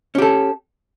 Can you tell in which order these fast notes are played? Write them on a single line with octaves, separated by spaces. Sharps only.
C#4 G4 A4